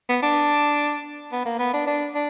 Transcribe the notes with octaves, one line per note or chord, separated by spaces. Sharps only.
B3
D4
B3
A#3
B3
D4
D4
D4